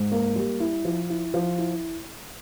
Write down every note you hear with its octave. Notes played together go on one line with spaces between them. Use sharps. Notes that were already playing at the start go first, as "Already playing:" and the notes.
Already playing: G#2
A#3
G3
E4
F3
E4
F3
E4